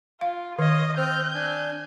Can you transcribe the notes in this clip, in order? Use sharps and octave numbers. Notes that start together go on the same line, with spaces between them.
F4 F5
D#3 C#5 D#5 F5
C4 C5 F6 G6
D4 G#5